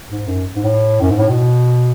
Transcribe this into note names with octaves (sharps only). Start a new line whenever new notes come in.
G#2
F#2
G#2
A2
F#2
G#2
A2
B2